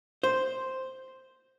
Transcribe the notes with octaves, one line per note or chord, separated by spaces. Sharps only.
C5